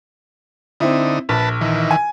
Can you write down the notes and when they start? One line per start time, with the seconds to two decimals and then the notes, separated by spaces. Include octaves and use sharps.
0.80 D3 C4 D#4 E4
1.29 A#1 B4 A5
1.61 D#3 E3
1.91 G#5